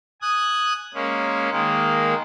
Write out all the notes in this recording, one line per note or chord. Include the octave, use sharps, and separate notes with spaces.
G#5 D#6 F#6
G#3 A#3 C#4
D#3 G#3 A#3